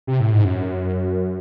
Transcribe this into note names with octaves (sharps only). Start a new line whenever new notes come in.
C3
A2
G#2
F#2